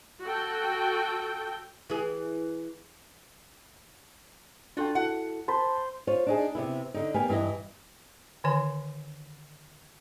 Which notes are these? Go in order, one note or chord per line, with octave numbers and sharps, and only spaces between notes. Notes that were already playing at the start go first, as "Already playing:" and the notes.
F#4 A4 G5
E3 G#4
D4 F4 F#4 A4 G5
E4 F#4 A4 F#5
C5 A5 B5
F4 C5 C#5
D4 D#4 G#4
C3 B3 E4
D3 D#4
A#3 B3 G4 G#5
G2 E3 E4 D#5
D3 D#3 C#5 G#5